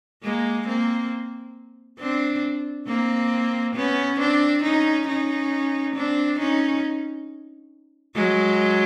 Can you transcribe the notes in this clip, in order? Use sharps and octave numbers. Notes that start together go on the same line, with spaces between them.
G#3 A#3
A#3 C4
C4 D4
A#3 C4
B3 C#4
C4 D4
C#4 D#4
C#4 D#4
C4 D4
C#4 D#4
F#3 G#3